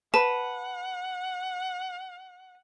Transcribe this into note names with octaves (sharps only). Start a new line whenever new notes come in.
B4 F#5 A5